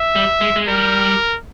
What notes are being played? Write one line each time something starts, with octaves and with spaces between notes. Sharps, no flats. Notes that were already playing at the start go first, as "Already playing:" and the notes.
Already playing: E5
G3
G#3
G#3
G3 A#4